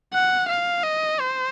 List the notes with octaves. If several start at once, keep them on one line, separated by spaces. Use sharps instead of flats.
F#5
F5
D#5
C5